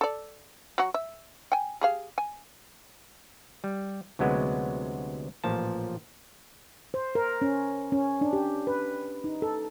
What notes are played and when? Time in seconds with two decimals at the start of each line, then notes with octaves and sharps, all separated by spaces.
0.01 A4 D5
0.78 F#3 F#4
0.94 E5
1.52 G5 G#5
1.81 G4 G#4 F5
2.18 G#5
3.64 G3
4.19 D2 C3 F#3 G#3 B3
5.44 A1 A#2 F3 A5
6.94 C5
7.15 A#4
7.42 C#4
7.92 C#4
8.21 D4
8.33 G4
8.67 B4
9.24 D#4
9.42 A4